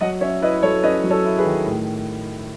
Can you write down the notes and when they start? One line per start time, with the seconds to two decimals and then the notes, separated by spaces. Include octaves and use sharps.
0.01 F#3 D#5 F#5
0.21 C#4 C#5 E5
0.42 E4 B4 D#5
0.62 F#3 A4 C#5
0.83 C#4 B4 D#5
1.04 F#3
1.10 A4 C#5
1.25 E4
1.38 G#4 B4
1.45 D#3
1.66 A2